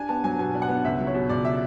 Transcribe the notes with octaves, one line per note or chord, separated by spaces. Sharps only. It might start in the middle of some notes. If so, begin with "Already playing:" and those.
Already playing: D4 G#5
B3 A5
F#3 G#5
B2 G#5
D4
F#5
B3
C#2 E5
F#3
C#5
B2
C#2 D5
E5